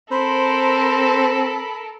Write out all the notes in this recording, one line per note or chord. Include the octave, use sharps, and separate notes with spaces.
C4 A4 A#4 C5 B5